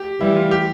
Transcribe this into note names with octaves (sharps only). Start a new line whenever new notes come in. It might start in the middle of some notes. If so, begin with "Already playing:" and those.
Already playing: G4
E3 G3 E4
F4
G4